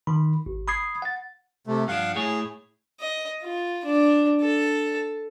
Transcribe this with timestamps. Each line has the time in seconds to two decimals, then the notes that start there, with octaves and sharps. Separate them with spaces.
0.07 D#3 B5
0.46 G#1
0.68 B5 D#6 G#6 C7
1.02 F#5 A6
1.67 C3 A3
1.88 G2 F3 D4 F5 F#5
2.16 A2 E4 G#4 C#5
3.00 D#5
3.43 F4
3.85 D4
4.42 A4